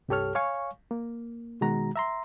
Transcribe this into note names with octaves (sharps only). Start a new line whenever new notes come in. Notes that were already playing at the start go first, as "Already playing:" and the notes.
C2 G2 G4 A4 C#5 F6
C#5 F5 G#5 C#6
A#3
B2 D#3 G#3 F#4 A#5
E5 A#5 C6